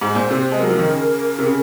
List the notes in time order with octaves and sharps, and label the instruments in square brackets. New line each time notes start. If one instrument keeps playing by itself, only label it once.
[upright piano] G#2 [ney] C5
[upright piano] A#2
C3
G#3
[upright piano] F#3 [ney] A#4
[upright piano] F3
D#3
C#3
C3
C#3